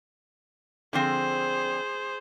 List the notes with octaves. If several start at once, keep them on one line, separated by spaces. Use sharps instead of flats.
D3 F3 C4 G#4 C5